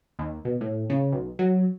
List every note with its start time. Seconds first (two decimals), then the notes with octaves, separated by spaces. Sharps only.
0.19 D#2
0.45 B2
0.61 A2
0.90 C#3
1.12 B1
1.39 F#3